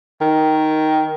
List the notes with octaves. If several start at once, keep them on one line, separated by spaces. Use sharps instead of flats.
D#3